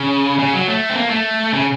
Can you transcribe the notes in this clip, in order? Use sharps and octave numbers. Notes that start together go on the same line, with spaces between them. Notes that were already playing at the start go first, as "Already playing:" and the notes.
Already playing: C#3
C#3
F#3
A3
C4
A#3
A3
C#3